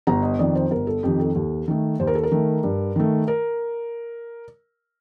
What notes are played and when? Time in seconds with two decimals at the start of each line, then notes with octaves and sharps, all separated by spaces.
0.07 G1 A#5
0.22 D#5
0.39 F2 D#3 D5
0.55 C5
0.71 G1 A#4
0.87 A4
1.03 F2 D#3 G4
1.20 A4
1.35 D#2
1.68 D#3 A3
2.00 D#2 C5
2.07 A#4
2.15 A4
2.23 A#4
2.31 D#3 A3
2.64 G2
2.96 D#3 A3
3.28 A#4